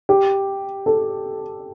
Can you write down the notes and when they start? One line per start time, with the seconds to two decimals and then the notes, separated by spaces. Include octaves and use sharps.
0.09 G4
0.86 A4